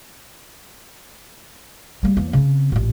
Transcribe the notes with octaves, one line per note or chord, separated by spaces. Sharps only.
G3 A#3
E2 A#3
C#3 C4
A1 A#2